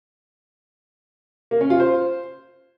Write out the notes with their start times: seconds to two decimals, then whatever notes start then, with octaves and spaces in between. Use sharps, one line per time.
1.51 A#3
1.61 C#4
1.70 F4
1.80 C5